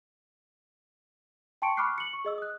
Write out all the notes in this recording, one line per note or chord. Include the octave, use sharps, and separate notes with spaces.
G5 A5 C6 C#6 C#7 D7
B5 C#6 D6 F6 F#6 C7
C#7 F#7
C#6
G#4 D#5 E6
D#6 F#6